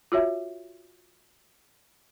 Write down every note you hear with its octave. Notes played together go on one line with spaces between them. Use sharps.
F4 F#4 C#5 E5